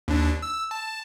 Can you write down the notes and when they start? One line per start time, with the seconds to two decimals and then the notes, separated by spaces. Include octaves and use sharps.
0.08 D#2 D4
0.42 E6
0.71 A5